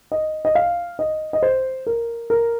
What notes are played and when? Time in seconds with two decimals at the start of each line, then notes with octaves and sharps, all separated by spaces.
0.12 D#5
0.45 D#5
0.55 F5
0.99 D#5
1.33 D#5
1.43 C5
1.87 A#4
2.30 A#4